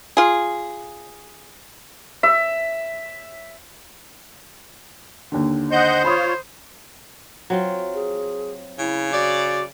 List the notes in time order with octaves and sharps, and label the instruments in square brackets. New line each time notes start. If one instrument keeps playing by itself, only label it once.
[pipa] F4 G#4
[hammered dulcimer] E5
[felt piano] D#2 D3
[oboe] C5 [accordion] D#5 F#5 G6
[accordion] F4 C#5 [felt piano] B5 D#6
[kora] F#3 C4 F4
[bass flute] G#4
[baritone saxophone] C#3 [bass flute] E4
[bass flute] F#4 [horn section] D5